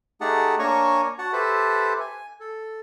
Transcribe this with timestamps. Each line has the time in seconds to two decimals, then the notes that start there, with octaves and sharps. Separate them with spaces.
0.21 A3 D#4 G4 G#4 F#5 A5
0.59 A#3 D4 C#5 G#5 A#5 C#6
1.19 F#4 F#5 A5
1.33 G4 A4 B4 C5 E5 A5
2.00 G#5
2.40 A4